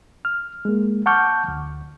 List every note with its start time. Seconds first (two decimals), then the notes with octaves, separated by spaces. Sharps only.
0.25 F6
0.65 G#3 A#3
1.06 F#5 A5 C#6 D6 F6 G6
1.48 D2